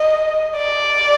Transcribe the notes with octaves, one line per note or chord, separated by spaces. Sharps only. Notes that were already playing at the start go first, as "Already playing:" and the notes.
Already playing: D#5
D5